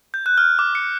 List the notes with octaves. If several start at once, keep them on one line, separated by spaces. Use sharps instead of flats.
G6
F#6
F6
D6
C#7